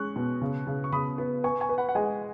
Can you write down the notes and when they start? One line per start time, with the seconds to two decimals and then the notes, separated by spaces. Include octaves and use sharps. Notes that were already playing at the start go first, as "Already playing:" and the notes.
Already playing: G#3 C#4 C#6 F#6
0.16 B2
0.41 C#3
0.67 C#3
0.84 C#6
0.93 C#3 B5 D#6
1.18 B3
1.44 B4 G#5 C#6
1.61 G#5 C#6
1.69 B4
1.78 F#5 B5
1.89 F#5
1.95 G#3 D#5 G#5